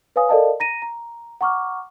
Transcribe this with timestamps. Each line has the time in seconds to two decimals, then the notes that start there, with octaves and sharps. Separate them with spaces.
0.16 B4 C#5 F5 G#5 D#6
0.29 A4 A#4 D5 D#5 F5 A5
0.60 A#5 A#6 D#7
0.82 A#5
1.41 F#5 A#5 C#6 D6 F6